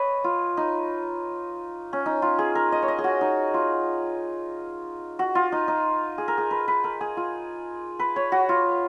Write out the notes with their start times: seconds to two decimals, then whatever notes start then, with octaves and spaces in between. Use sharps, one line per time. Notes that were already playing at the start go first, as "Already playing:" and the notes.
Already playing: B4 C#5 D#5
0.24 F4
0.57 D#4
1.93 C#4
2.06 D#4
2.22 F4
2.39 G#4
2.55 A#4
2.72 D#5
2.82 C#5
2.88 D#5
2.99 G#4
3.04 F#4
3.21 D#4
3.54 F4
5.19 F#4
5.35 F4
5.52 D#4
5.68 D#4
6.18 G#4
6.28 A#4
6.38 G#4
6.51 B4
6.68 B4
6.84 A#4
7.01 G#4
7.17 F4
7.99 B4
8.16 C#5
8.32 F#4
8.49 F4